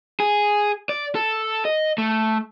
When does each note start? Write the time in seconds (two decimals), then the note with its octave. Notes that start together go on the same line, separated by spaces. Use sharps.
0.20 G#4
0.89 D5
1.15 A4
1.65 D#5
1.98 A3